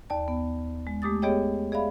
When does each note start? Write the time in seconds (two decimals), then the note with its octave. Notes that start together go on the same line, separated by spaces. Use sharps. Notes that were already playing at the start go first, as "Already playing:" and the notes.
0.10 D#2 D5 A5
0.28 B3
0.87 G#3
1.02 G#3 A3 G4 D6 D#6 A6
1.22 B3 G4 G#4 C#5 D#5 G5
1.72 G#4 D5 E5 F5 B5